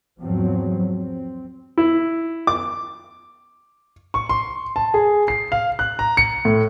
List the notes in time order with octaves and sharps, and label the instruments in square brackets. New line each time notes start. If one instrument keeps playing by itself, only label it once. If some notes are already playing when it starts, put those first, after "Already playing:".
[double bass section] E2 G#2 F3 F#3 C4
C4
[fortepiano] E4
D6
[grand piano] C#6
C6
A5
G#4
C7
F5
F#6
A#5
C#7
A2